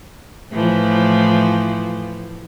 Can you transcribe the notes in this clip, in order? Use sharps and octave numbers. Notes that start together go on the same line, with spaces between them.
A2 E3 F3